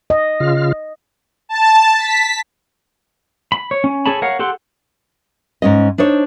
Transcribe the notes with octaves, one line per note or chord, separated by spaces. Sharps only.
D#5
C#3 F4 F6
A5
B6
B5
C#5
C#4
G#4 A4 C#5 A5 B5
A#4 C#5 F5 F#5
G4 A4 F#5 C6
G#2 C#4 D#5
D4 D#4 C5 C#5